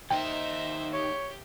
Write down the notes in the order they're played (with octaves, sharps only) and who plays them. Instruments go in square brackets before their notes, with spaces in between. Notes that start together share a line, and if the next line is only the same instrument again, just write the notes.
[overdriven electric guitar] D#2 D#4 [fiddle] C5 E5 [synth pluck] G5
[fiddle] G4 [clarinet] C#5